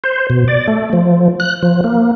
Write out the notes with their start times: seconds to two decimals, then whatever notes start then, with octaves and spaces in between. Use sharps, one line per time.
0.04 C5
0.30 B2
0.48 D5
0.68 A3
0.93 F3
1.40 F#6
1.63 F3
1.84 A#3